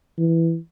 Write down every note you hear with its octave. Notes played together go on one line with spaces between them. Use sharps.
E3